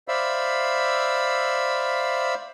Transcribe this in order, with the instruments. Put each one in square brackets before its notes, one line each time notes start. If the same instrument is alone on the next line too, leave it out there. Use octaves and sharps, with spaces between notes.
[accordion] C5 D5 E5 F5 B5 E6